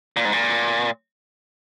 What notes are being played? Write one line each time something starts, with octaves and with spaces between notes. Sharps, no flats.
A#2
G#2
A#2